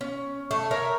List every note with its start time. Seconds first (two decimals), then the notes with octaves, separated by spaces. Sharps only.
0.01 C#4
0.51 A3
0.71 A#4 C#5 E5